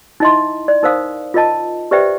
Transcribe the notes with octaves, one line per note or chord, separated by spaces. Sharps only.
D#4 E4 D#5 E5 C6
D5
D#4 A#4 C5 F5 D#6
F4 A#4 D#5 A5
G4 B4 C5 D5 E5 G5